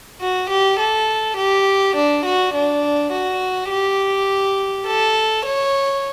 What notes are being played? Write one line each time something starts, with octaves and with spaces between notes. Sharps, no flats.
F#4
G4
A4
G4
D4
F#4
D4
F#4
G4
A4
C#5